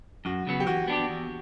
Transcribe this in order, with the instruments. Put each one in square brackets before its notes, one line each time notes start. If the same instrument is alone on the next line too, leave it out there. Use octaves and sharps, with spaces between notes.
[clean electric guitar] F#2 [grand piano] F#4
[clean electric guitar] C#3 F#3 B3
[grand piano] G4
[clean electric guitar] E3 [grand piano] F#4
[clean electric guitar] B3 D4 G4
E2